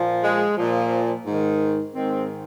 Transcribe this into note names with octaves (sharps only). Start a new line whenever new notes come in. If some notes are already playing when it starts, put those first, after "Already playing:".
Already playing: A#2 F3
G#3
A#2 F3
G#2 D#3
G#2 D#3 C4